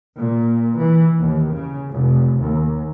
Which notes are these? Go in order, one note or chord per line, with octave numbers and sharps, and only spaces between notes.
A#2
E3
D#2
C#3
F1
D#2